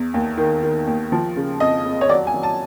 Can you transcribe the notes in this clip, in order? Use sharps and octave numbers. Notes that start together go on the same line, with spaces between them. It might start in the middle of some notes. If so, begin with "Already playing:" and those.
Already playing: E2
D#2
D#3
D#3
D#2
F3
C#3
F2 D#5
F2
C#5
F#3 D5
G#5
F#3
A5